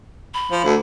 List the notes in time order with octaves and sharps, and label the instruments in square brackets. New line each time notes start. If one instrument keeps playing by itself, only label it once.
[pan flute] B5
[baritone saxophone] F3
D2